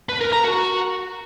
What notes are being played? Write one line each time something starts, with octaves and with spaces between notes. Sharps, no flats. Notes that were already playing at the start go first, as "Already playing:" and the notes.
B4
A#4
A#5
F#4